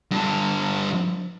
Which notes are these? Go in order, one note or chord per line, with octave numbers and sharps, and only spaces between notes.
G2 D3